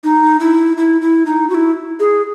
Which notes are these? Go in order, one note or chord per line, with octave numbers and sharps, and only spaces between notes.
D#4
E4
E4
E4
D#4
F#4
E4
G#4